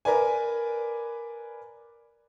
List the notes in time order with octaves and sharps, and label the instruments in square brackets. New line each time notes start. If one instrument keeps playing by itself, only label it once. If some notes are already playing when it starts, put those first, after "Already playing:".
[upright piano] A#4 B4 D5 G#5